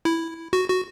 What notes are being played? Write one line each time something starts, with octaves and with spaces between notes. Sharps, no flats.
E4
F#4
F#4